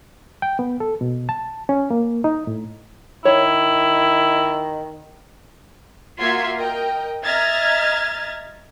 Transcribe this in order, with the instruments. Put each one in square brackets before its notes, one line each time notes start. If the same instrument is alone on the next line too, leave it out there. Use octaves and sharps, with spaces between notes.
[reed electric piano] G5
B3
A4
B2
A5
C#4
A#3
D#4
A2
[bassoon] D#3 [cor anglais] E4 [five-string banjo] C#5
[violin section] A#3 F4 F#4 E5 C6 G#6
A#4 D#5 G5
D#5 E5 A#5 F6 G#6 A6